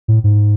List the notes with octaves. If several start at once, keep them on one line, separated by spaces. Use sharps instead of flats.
A2
G#2